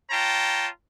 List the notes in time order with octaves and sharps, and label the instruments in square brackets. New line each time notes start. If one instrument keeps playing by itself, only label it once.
[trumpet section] F4 C#5 G5 A5 A#5